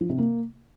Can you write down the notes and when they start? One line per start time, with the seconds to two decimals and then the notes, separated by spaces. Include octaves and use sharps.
0.01 F3
0.10 C3
0.18 A#3